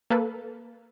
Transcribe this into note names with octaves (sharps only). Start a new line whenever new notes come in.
A#3 A4 B4